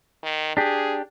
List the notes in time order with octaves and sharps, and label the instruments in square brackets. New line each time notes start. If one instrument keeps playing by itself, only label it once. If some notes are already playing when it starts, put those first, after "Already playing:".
[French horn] D#3
[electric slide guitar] D4 G4 [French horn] G#4